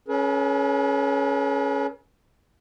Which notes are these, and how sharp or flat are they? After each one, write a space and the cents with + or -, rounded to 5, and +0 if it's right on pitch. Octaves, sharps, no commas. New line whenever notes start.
C#4 +0 G#4 +45 B4 -40